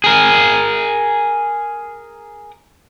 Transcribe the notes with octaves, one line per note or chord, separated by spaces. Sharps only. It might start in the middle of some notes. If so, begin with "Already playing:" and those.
G#4 A#4